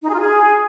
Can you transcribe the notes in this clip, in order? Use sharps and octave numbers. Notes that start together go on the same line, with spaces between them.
D#4
G#4
F4
G#4